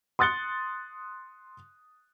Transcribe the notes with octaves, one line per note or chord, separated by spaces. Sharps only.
C6 D#6 F#6 A6 C#7 G7